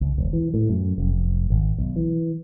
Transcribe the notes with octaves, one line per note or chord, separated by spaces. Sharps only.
C#2
E1
E3
A2
F#2
F1
G#1
B1
E3